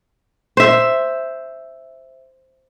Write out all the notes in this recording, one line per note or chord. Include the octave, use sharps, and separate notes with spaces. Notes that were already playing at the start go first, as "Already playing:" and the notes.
C5 E5